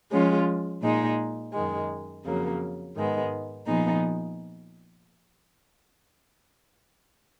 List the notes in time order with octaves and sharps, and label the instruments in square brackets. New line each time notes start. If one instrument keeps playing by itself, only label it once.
[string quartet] F3 G#3 C#4 F4
A#2 G#3 D#4
F#2 D#3 G#3
F2 C#3 F#3 A#3
G#2 D#3 G#3 B3
A#2 F3 B3 D#4 G#4